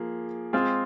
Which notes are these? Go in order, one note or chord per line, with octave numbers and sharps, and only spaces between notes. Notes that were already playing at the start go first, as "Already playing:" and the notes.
Already playing: F3 A#3 G#4
G#3 C4 F4 G#4